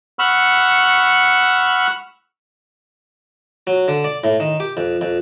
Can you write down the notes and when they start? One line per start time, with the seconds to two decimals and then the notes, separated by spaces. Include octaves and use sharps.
0.19 F#5 B5 C#6 E6 F6
3.67 F#3
3.88 D3
4.04 D5
4.24 A2
4.40 D#3
4.60 G4
4.77 F2
5.01 F2